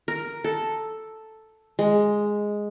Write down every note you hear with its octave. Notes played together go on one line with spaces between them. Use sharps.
A#4
A4
G#3